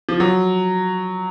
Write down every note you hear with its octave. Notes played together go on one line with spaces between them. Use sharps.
F3
F#3